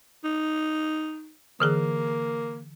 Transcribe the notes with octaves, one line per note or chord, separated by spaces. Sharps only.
D#4
D3 E3 A#3 G#4